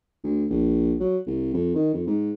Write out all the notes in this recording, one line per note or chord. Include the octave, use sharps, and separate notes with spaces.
D2
A#1
F#3
C2
F2
D#3
F2
G#2